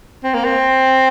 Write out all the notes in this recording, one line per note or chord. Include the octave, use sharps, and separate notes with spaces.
C4
A#3
C4